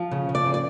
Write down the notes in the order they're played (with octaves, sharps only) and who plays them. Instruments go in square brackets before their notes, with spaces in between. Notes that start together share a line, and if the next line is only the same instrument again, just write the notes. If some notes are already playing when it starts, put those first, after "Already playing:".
Already playing: [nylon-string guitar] F3
C#3
C#3
D5
C#3
D5